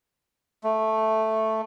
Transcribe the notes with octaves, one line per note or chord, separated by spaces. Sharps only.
A3